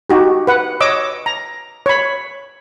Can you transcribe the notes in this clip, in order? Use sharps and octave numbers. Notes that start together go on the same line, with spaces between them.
D#4 F#4 G4
B4 F#5
C#5 D#5 D6 E6
A#5
C#5 B5